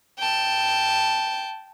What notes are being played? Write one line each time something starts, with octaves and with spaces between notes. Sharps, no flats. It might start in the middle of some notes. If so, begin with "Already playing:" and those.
G5 A5